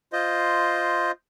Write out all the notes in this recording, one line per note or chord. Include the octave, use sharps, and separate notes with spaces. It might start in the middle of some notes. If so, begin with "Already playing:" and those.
F4 C5 D#5